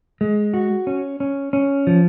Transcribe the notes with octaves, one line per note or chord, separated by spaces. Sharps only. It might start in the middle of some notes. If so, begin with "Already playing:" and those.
G#3
F#4
C#4
C#4
C#4
F3